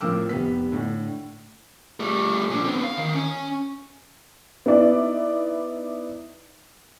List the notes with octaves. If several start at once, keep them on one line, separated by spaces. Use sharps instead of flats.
A2 F3 C4 A#4 D6 E6
F1 G3 B3 B6
A2 D3
G3 A3
A#2 D4
B3 C4
F5
D#3
C#4
B3 D#4 E4 D5